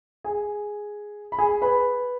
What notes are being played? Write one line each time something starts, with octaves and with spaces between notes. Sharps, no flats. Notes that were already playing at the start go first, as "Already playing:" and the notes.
G#4 G#5
B5
G#4 G#5
B4 B5